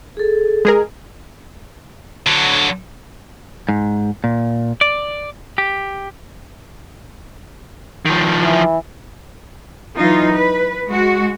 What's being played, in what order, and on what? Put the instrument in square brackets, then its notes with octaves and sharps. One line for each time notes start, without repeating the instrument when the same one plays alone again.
[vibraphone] G#4 A4
[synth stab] G#3 G#4 A#4
[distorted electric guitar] D3 F#3
[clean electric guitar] G#2
A#2
D5
G4
[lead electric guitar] D#3 F3
[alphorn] E3
[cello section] E3 F#3 D#4 F4
B4
G#3 F#4